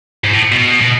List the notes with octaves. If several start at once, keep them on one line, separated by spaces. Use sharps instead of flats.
G#2
A2
B2
B2